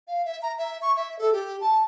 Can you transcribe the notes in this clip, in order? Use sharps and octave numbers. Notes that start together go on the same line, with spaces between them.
F5
E5
A#5
E5
C#6
E5
A4
G4
A5